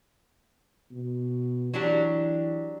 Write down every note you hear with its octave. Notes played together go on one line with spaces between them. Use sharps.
B2
E3 F#3 D4 G4